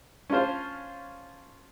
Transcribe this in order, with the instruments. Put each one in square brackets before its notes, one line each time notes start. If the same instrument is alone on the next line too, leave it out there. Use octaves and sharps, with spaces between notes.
[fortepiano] C#4 D4 F4 C5